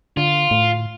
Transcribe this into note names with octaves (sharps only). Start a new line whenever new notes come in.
D3 F4
A2